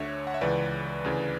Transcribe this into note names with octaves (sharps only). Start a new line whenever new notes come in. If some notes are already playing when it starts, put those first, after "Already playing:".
Already playing: D2 D3 C#5 E5
F#5
E5
C#2 C#3 E3 B4 D5
D2 C#3 E3